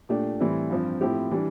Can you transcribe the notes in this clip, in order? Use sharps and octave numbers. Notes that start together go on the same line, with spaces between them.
A#2 A3 D4 G4
A2 E3 G3 C4 E4
G2 F3 C4
A2 F3 C4 E4 G4
E3 G3 D4